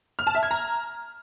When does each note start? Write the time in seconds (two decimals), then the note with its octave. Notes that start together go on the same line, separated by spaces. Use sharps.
0.19 F6
0.27 A5
0.35 E5
0.43 G#6
0.51 A#5